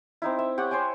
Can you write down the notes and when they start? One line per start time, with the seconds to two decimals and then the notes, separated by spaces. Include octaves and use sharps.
0.22 C4 D#4 E4
0.39 E5
0.58 G4 C#5 F#5
0.71 C5 C#5 G5 G#5